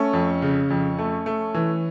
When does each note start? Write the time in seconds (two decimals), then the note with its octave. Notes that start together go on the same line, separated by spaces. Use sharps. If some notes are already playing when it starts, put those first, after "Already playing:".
Already playing: A3 C#4
0.13 F2
0.42 C#3
0.70 F2
0.99 A3
1.26 A3
1.54 E3